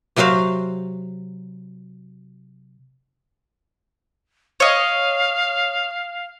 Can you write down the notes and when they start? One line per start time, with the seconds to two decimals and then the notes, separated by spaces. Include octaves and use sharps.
0.16 C3 F#3 F#4 C5 F5
4.60 C#5 D#5 F5